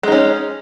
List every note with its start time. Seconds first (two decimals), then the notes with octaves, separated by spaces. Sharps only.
0.03 G#3
0.08 D#4
0.12 C#4